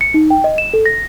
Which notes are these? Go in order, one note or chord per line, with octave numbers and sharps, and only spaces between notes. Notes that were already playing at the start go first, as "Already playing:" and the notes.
C#7
D#4
G5
D#5
E7
A4
A#6